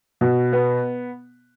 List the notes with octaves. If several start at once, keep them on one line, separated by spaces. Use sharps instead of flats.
B2
B3